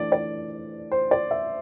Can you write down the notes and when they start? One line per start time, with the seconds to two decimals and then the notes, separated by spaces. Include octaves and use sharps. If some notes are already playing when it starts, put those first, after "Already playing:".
Already playing: E3 A3 D4 D5
0.12 D5
0.92 C5
1.11 D5
1.31 E5